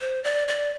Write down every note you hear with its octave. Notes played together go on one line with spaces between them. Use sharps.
C5
D5
D5